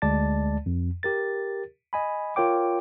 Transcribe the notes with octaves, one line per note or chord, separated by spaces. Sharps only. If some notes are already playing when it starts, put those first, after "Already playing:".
D2 G#3 D5 A5 A6
F2
G4 A#4 A6
D#5 G#5 B5
F4 A#4 C#5 G5 D6